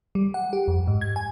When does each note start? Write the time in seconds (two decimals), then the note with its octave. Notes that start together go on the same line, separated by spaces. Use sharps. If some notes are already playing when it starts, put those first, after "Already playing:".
0.15 G3
0.34 F#5
0.53 G4
0.68 F2
0.87 G#2
1.01 G#6
1.16 G#5